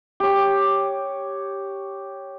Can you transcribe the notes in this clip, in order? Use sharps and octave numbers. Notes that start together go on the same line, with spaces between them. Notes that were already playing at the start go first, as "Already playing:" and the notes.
G4 C#5